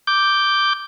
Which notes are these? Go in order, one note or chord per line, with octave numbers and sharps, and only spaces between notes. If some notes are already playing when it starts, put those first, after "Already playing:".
D6 G6